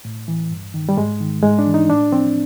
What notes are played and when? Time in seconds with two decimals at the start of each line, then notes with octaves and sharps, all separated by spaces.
0.05 A2
0.28 E3
0.51 G2
0.74 D#3
0.89 G3
0.97 G#2 G#3
1.20 D#3
1.43 G#2 G#3
1.59 D4
1.66 E3
1.74 D#4
1.89 A2 D4
2.12 F3 C4